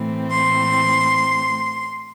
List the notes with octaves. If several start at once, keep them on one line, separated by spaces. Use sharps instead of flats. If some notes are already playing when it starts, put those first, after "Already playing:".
Already playing: A2 E3 A3 C4
C6